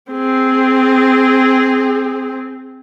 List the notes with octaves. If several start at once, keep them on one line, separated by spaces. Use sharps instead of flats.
C4 G#4